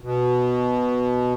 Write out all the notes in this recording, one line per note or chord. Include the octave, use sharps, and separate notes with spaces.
B2